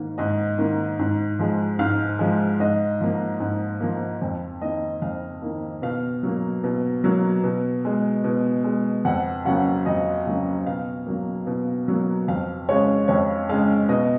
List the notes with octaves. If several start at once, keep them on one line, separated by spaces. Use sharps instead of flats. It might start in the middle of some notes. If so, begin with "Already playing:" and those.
Already playing: G#2 D#3 A#3
G#2 D#5
D#3 A#3
G#2
F3 G#3
G#2 F5
F3 G#3
G#2 D#5
F3 A#3
G#2
F3 A#3
F2
D#3 A#3 D#5
F2 F5
D#3 A#3
B2 F5
F#3 A#3
B2
F#3 A#3
B2
G#3
B2
G#3
F2 F#5
C#3 F#3 A#3 F#5
F2 D#5
C#3 F#3 A#3
B2 F5
F#3 A#3
B2
F#3 A#3
F2 F5
C#3 G#3 C#5
F2 C#5
C#3 G#3 F5
B2 D#5